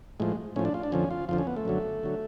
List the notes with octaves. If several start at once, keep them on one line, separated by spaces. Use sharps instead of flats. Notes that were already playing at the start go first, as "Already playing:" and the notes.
A2 F3 G#3
A2 F3 C#4
D4
F4
D4
F2 D3 F3 C#4
F4
F2 D3 F3 F4
C#4
B3
A3
F#2 D3 F#3
D3 F#3